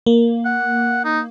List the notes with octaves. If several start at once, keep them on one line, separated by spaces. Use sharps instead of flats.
A#3
F#5
D#4